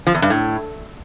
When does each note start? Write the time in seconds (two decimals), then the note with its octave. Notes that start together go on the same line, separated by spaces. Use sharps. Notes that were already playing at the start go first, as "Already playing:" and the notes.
0.07 F3
0.14 E2
0.22 G2
0.30 A2